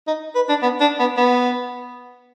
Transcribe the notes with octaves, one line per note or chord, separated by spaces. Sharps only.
D#4
B4
D4
B3
D4
B3
B3